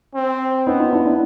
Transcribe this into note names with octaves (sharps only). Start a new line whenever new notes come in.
C4
B3 C#4 D#4
D#4 F4
D4 E4
D4 E4